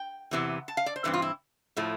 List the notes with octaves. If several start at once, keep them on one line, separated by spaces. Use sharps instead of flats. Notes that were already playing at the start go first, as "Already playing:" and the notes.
Already playing: G5
E2 C3 E3 B3
A5
F5
D5
C5
G2 E3 C4 B4
F4
E4
A2 F3 A3